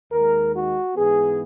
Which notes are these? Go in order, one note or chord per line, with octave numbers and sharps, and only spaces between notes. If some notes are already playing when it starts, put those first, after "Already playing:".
D#2 D#3 G#3 A#4
F#4
G#2 E3 B3 G#4